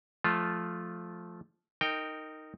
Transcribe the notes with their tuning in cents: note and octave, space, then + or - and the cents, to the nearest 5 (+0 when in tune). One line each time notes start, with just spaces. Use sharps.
F3 +0 A3 -15 F4 +0
D#4 +0 A#4 -20 G5 +0